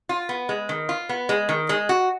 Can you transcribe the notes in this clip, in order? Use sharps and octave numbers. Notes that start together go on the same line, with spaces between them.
F4
B3
G#3
D#3
F4
B3
G#3
D#3
G#3
F#4